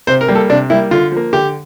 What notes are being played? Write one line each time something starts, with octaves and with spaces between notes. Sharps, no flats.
C3 C5
A#4
G3 A#3
A4
C3 D4
G3 A#3 E4
D3 F4
F3 A#3
D3 G4